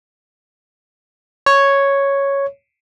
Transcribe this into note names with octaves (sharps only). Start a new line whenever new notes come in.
C#5